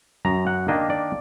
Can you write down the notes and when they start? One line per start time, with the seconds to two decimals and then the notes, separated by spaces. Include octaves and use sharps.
0.25 F#2 A#5
0.47 F#5
0.68 D#3 A#3 D4 D#5
0.90 D5